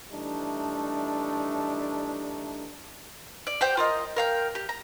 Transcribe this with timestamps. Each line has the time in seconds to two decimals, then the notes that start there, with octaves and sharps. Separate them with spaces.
0.12 E3 G3 A3 D4 D#4
3.47 D5
3.61 G4 C5 G5
3.77 F4 A#4 D#5
4.16 A#4 F5 G5
4.55 G4
4.69 A#5